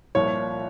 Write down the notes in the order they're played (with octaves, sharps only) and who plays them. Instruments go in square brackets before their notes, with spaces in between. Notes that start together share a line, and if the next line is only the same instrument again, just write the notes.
[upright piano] C2 A#2 F3 C#5